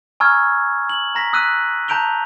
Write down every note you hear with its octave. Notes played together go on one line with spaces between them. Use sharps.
G#5 A#5 C#6 E6 F6 G#6
F#7
A#5 A#6 B6
D#6 E6 F#6 B6 D#7
A5 A#5 G6 D7 F7 G7